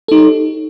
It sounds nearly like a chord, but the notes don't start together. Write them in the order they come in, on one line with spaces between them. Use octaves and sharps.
A4 D#4 G4 C#5